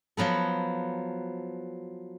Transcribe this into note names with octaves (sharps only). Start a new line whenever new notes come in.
F3 F#3 B3 A4